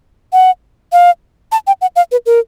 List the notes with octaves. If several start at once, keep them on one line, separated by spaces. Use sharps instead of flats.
F#5
F5
A5
G5
F#5
F5
B4
A#4